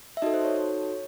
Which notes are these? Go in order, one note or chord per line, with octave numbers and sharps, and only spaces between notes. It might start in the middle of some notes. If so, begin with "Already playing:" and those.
E5
D#4 F#4 A4 D#5
C5
C#5